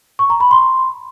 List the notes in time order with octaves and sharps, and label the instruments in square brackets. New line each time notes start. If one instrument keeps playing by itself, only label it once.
[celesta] C#6
A#5
B5
C6